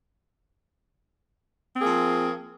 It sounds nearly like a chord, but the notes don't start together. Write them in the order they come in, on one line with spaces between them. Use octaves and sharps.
C4 G#4 A#3 F3